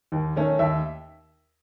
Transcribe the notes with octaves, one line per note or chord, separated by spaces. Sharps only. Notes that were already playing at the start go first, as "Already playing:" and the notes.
D#2
D#3 A3 C#4
D#2 E5